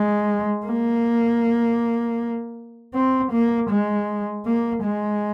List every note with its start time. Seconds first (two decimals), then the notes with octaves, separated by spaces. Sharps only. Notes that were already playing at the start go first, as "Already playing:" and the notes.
Already playing: G#3
0.66 A#3
2.94 C4
3.32 A#3
3.70 G#3
4.46 A#3
4.84 G#3